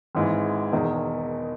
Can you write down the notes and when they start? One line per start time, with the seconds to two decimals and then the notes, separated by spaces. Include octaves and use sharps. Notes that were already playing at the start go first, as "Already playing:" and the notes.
0.15 G#1 G#2 E3
0.72 E1 E2 D#3